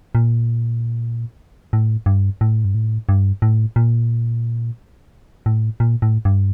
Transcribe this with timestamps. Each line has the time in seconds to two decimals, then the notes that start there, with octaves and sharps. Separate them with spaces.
0.15 A#2
1.73 A2
2.06 G2
2.41 A2
2.65 G2
2.75 A2
3.09 G2
3.42 A2
3.76 A#2
5.46 A2
5.80 A#2
6.02 A2
6.25 G2